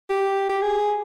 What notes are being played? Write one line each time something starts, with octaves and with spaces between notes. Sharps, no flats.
G4
G4
G#4